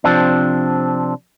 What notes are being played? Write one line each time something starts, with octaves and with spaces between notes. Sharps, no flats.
C3 F3 C4 D4